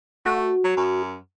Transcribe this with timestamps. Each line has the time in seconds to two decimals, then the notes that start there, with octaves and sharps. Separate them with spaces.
0.26 A3 F#4
0.64 F#3
0.77 F#2